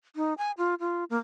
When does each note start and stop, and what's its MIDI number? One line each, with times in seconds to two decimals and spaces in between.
0.16 0.34 63
0.38 0.51 80
0.58 0.75 65
0.80 1.04 65
1.10 1.17 58